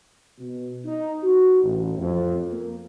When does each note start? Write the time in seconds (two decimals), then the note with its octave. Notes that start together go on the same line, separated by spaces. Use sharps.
0.39 B2
0.85 D#4
1.23 F#4
1.63 A1
1.97 F2
2.52 A#3